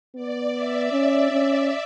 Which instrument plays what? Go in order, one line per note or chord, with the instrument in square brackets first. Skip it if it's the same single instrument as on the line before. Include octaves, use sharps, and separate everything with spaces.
[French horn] B3 [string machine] D5
[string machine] E5
[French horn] C#4
C#4